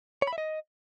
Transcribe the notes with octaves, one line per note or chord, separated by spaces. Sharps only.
C#5
B5
E5
D#5